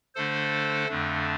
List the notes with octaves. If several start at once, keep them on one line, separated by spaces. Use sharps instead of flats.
D3 A3 D4 A4 C5
F2 D3 A3 D4